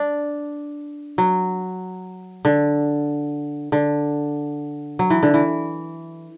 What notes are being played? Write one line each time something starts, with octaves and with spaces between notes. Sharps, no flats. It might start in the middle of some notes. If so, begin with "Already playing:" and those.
Already playing: D4
F#3
D3
D3
F#3
E3
D3
E3